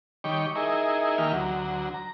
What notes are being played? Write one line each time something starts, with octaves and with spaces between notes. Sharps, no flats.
D#3 G3 C#5 G5 D6
D#4 E4 G#4 A#4
D#3 E3 A#3 G4 F6
D2 F#3
A#5